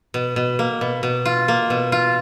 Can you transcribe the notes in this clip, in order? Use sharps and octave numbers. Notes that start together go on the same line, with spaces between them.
B2
B2
A#3
B2
B2
F4
A#3
B2
F4